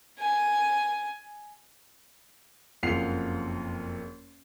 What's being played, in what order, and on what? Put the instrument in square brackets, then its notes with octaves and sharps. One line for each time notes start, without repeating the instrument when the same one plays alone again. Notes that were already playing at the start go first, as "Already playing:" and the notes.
[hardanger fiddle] G#5
[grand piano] F#1 F2 F4 F#5 C7 F7